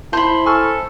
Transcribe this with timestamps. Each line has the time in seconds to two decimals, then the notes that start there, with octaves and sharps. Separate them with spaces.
0.13 E4 C5 A5 B5 C6
0.46 A4 G#5 C#6 F6